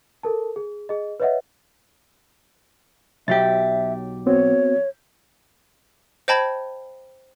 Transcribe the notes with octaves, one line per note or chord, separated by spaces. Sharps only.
A4 A#4 A5
G#4
G#4 D#5
B4 C#5 D#5 E5 F#5
B1 F#3 G4 E5 A6
B3 C4 F#4 C#5
C5 D#5 G5 A5 B5 G#6